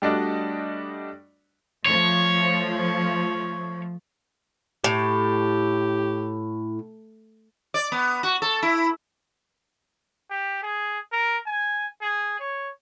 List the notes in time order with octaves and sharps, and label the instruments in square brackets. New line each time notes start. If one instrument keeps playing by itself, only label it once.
[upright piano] G3 A3 D4 F#4 D5 D#5
[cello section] F3 A3 [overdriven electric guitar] C#5
[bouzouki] A2 [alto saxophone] G4
[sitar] D5
B3
F#4
A4
E4
[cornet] G4
G#4
A#4
G#5
G#4
C#5